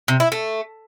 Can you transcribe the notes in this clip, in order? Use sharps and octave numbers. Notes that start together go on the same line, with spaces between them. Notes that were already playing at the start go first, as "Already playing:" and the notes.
C3
E4
A3